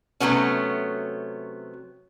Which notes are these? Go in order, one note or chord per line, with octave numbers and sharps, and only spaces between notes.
C3 F#3 A3 B3 C#4